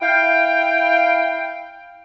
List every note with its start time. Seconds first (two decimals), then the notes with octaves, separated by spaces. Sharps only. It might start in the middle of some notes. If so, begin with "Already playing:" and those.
0.02 E4 F5 G5